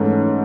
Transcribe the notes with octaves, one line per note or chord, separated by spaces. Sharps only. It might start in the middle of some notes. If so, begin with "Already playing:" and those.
Already playing: G#2 E3 A3 C#4